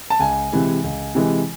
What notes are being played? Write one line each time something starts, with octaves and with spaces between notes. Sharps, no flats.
A5
C#2 G#5
C3 E3 G#3
C#2
C3 E3 G#3